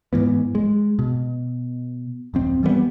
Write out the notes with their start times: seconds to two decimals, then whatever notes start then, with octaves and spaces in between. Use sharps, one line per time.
0.13 G#2 E3 B3
0.55 G#3
0.99 B2
2.34 D1 F2 C4
2.63 E3 G3 G#3 B3